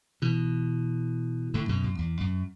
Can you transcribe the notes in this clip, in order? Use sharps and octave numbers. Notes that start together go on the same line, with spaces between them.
B2 E3
A2 D3
F#2 B2
F#2
E2
F#2